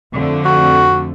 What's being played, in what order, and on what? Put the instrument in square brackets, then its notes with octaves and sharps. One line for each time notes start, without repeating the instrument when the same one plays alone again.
[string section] F2 D3 A3
[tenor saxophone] F#4